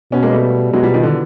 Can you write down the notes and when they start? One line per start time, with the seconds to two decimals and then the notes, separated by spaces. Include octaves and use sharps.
0.12 B2 B3 C#4
0.22 G#3 A#3
0.33 G3 A3
0.73 B2 F#3 G#3
0.83 F3 G3
0.94 D#3 F3
1.03 D3 E3